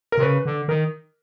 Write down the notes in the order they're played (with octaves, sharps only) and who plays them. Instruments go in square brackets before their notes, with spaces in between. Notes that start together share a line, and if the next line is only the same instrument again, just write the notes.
[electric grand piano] A#4
[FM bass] C3
[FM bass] C#3 [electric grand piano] B4
[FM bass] D3
[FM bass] D#3 [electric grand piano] A#4